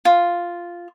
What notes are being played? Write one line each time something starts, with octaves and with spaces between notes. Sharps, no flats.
F4